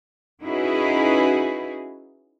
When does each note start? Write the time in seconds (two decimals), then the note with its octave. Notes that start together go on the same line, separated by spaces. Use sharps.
0.42 C#4 D#4 E4 F#4 G#4 B4